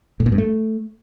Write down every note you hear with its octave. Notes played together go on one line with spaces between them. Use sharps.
A2
A#2
G2
A3